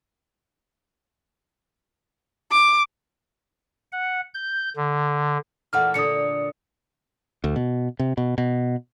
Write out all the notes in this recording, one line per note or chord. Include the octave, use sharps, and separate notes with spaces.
D6
F#5
G6
D3
A#2 E3 A3 F#5 F6
A#2 D3 D#6 C#7
D2
B2
C3
B2
B2